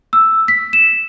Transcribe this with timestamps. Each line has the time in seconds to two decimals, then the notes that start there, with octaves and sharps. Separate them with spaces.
0.13 E6
0.48 B6
0.73 E7